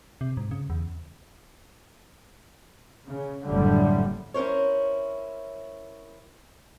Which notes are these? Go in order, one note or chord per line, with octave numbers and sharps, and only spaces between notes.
C3
G#2
C#3
E2
C#3
F#1 A2 D3 G3
C#4 E4 A#4 C5 C#5